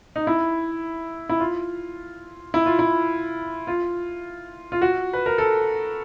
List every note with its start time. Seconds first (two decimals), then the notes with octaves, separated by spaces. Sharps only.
0.16 D#4
0.27 E4
1.29 E4
1.40 F4
2.54 E4
2.66 F4
2.79 E4
3.67 F4
4.72 F4
4.81 F#4
5.13 B4
5.26 A#4
5.38 A4